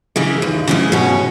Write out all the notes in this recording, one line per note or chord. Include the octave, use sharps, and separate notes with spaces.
C#3 E3 G#3
D#2
C#3 E3 G#3
B2 C#4